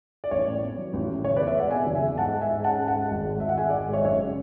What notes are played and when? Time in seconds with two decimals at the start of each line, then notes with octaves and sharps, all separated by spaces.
0.24 D5
0.31 A1 C#5
0.47 A2
0.62 B3
0.78 F#3
0.93 A1
1.09 A2
1.24 F#1 C#5
1.36 B4 D5
1.40 E2
1.47 C#5 E5
1.55 G#3 D5 F#5
1.71 B2 E5 G#5
1.87 F#1
1.94 E5 G#5
2.02 E2
2.17 G#2 F#5 A5
2.33 G#3
2.41 E5 G#5
2.49 G#2
2.64 C#4 F#5 A5
2.80 G#2
2.88 F#5 A5
2.96 G#3
3.11 G#1
3.27 G#2
3.40 G#1 E5
3.49 F#5
3.58 G#3 E5 G#5
3.69 D5 F#5
3.74 G#1
3.89 G#2 C#5 E5
4.04 F#2 C#5 E5
4.20 C#3